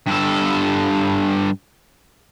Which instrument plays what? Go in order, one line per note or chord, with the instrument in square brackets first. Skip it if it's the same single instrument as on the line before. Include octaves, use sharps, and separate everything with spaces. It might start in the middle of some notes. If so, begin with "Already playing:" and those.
[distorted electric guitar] G2 A4